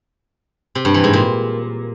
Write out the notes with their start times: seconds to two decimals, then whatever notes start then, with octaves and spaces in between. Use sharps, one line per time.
0.75 C3
0.85 G2
0.94 E3
1.04 G#2
1.13 A#2